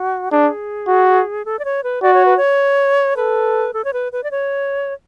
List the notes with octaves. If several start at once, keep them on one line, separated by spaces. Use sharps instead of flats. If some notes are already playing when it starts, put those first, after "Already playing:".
Already playing: F#4
D4 G#4
F#4
A4
D5
C#5
B4
F#4 D5
C#5
B4
C#5
A4 B4
A4
C#5
B4
B4
D5
C#5